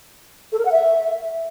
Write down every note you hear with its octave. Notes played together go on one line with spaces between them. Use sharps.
A4
A#4
F#5
E5